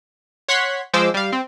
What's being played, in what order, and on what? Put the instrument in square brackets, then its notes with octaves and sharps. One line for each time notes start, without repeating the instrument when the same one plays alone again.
[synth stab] C#5 F#5 C6 F#6 G#6 B6
F3 G#3 C5 D6 E6
G3 F5
C4